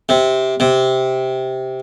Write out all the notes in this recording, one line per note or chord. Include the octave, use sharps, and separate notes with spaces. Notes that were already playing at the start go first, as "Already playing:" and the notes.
C3
C3